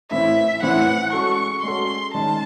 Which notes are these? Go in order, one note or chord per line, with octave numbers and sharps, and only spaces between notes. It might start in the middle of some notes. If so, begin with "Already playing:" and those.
A2 E3 C4 E4 E5
A2 E3 C4 E4 F#5
G#3 C#4 F#4 A4 C#6
G#3 C#4 F#4 A4 C6
D#3 G#3 C#4 A5